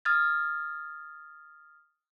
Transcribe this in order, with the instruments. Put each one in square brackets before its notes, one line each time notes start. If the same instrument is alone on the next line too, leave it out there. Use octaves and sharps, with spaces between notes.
[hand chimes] D#6 F6 G#6 A6